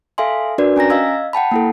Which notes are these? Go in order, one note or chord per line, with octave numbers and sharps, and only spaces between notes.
A4 E5 F5 G#5 C6
D4 F#4 A#4 B4 D5
C#4 G#5 A#5 A#6
D#5 F5 E6 G#6
F#5 G5 A5 B5
A#3 E4 A4